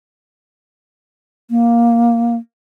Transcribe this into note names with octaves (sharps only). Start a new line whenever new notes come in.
A#3